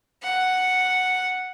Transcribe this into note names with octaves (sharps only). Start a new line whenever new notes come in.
F#5